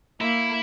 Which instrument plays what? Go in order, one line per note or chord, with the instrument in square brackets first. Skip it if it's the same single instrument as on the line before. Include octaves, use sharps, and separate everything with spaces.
[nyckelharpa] A#3 [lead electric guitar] E4